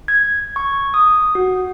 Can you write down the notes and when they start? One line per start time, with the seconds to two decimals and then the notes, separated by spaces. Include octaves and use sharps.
0.08 G#6
0.56 C#6
0.94 D#6
1.35 F#4